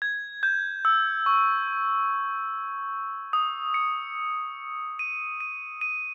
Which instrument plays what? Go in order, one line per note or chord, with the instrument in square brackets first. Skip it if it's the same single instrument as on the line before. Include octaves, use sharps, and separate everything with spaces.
[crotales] G#6
G6
E6
C#6
D#6
C#7
D#7
D#7
D#7